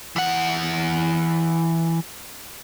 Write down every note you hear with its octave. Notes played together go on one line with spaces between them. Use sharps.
E3 F#5